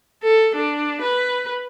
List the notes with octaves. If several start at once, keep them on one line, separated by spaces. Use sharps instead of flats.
A4
D4
B4